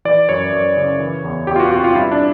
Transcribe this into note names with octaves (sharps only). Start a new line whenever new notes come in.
E3 D5
F#2 C#5
F#2
C#3
E3
E2
E2 G4
F4
F#4
C3 F#4
F4
G2 E4
D4